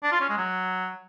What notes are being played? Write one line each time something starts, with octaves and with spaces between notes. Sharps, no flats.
D4
F4
C#4
G#3
F#3